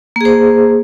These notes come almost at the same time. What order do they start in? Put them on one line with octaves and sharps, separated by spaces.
A#3 G#4 C5